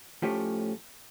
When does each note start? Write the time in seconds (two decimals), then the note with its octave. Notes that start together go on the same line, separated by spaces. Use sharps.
0.22 A2 F3 A3 C#4 G4